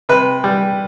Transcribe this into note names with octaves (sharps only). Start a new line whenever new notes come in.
C3 B4
G3